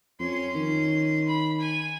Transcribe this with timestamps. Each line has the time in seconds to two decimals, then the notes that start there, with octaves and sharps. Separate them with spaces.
0.20 F2 C#4 C6
0.55 D#3
1.27 B5
1.60 G#5